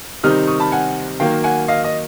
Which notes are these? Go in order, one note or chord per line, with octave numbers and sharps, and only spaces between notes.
C3 D#3 G3 C4 D#4 D#6 F6
C#6 D#6
A5 B5
F#5 G#5
D#3 F#3 A#3 F5 G5
F#5 G#5
D#5 F5
D#5